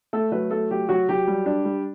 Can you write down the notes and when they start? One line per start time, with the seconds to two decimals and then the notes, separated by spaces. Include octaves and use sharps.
0.13 A3 A4
0.32 F#3 B4
0.51 A3 A4
0.71 F#3 G4
0.89 F#3 F#4
1.09 F#3 G4
1.27 G3
1.46 D4
1.65 G3